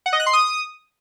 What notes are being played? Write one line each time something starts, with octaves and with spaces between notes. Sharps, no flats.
F#5
D#5
F#6
C6
D#6